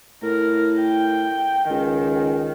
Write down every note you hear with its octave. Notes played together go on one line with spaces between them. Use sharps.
A2 A#4
G5
C#2 D#3